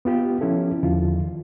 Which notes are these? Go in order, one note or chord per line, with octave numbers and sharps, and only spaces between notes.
B3 F4 G4
F3 C#4 E4 A4
E2 D3 D#3 F3 F4